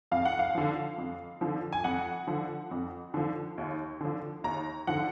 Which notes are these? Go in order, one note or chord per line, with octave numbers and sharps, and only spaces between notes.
F2 F5
F#5
F5
D3 F3
F2
D3 F3
G#5
F2 F#5
D3 F3
F2
D3 F3
D#2
D3 F3
D#2 A#5
D3 F3 F#5